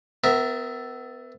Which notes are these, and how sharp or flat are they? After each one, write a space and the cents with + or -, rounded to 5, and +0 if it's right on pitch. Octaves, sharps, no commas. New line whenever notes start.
B3 +35 A#4 +0 E5 +0